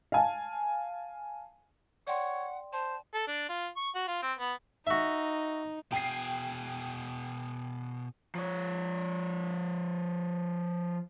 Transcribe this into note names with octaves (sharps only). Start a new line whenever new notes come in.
F5 G#5 A5
C#5 D5 F#5 G5 C6
C5 A5
A4
D4
F4
C#6
F#4
F4
C4
B3
D#4 F#4 E5
B2 G#4 G5 C7
F3 C#5